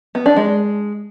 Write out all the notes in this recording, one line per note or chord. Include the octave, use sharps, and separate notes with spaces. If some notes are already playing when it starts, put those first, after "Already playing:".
B3
D4
G#3